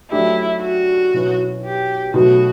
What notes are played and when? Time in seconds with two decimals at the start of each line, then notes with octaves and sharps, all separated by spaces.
0.11 F#3 A3 D4 E4 G4
0.62 F#4
1.14 B2 F#3 C#4 E4 B4
1.64 G4
2.14 B2 F#3 A3 F#4